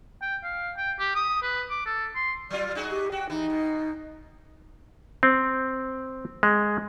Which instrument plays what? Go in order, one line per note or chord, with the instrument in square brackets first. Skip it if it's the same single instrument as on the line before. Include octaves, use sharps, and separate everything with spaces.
[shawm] G5
F5
G5
G4
D#6
B4
D6
A4
C6
[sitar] F#3 F4 [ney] D5
[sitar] D#4 F#4 G#4
[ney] G4
[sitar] F#4 [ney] G5
[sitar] E3 [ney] D#4
[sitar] B2
[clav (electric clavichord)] C4
G#3